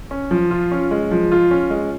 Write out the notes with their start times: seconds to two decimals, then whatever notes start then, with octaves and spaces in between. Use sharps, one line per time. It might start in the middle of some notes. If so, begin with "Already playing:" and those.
0.11 C#4
0.31 F3
0.51 F4
0.72 C#4
0.91 G#3
1.11 F3
1.32 F4
1.51 C#4
1.70 G#3